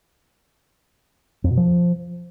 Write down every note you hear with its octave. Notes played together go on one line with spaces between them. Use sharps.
F2
B2
F3